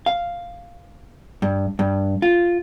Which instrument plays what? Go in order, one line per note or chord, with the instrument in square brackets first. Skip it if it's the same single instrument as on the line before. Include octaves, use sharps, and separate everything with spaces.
[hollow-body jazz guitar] F5
G2
G2
F4